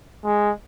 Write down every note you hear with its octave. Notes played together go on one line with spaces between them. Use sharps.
G#3